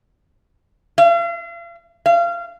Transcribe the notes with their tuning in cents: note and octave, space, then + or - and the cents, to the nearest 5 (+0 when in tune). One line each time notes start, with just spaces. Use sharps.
F5 -40
F5 -25